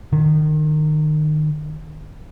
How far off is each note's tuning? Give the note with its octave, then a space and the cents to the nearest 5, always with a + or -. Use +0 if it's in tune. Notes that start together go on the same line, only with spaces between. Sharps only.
D#3 -30